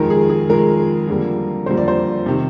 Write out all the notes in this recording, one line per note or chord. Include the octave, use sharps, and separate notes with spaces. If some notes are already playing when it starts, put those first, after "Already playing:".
Already playing: F2 D#3 G#3 A#4
G#4
G#4
F2 D#3 G#3 A#4
F2 D3 G3 A#3
F2 D3 G3 A#3 C5
D5
C5
C3 D#3